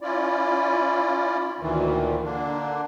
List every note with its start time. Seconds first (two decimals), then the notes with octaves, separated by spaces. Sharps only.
0.01 C#4 E4 F4 D5
1.60 D2 A#2 D#3 E3
2.24 D3 A#3 D4